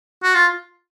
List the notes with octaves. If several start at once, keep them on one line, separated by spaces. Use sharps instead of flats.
F#4
F4